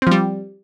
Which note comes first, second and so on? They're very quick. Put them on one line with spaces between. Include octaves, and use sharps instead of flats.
C4 F3 G3